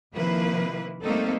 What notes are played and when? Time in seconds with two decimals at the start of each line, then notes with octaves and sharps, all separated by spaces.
0.14 C3 D#3 F3 A#3 E4 B4
1.02 G3 A3 A#3 C4 D#4 A4